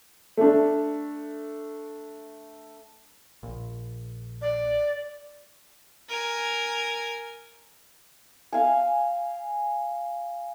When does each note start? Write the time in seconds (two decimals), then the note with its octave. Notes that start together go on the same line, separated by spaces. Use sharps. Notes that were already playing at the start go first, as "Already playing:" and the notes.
0.37 A3 D4
3.43 A#1
4.42 D5
6.09 A#4 G#5
8.53 F5 G#5